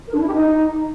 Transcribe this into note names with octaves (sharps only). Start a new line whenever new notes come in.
A#4
D4
E4
G4
D#4